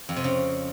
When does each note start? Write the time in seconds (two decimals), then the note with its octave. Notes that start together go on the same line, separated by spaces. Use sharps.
0.09 F2
0.16 C3
0.24 C#3